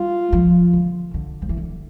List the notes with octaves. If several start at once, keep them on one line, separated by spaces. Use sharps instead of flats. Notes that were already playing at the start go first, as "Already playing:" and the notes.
Already playing: G3 F4
F3
D3
D3
F3
E3
D3